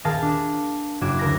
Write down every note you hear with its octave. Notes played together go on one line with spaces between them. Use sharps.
D#1 G#4 A#4 F5 A5
D4
F#1 F#4 D6 G#6 E7
D2 A#4 A#6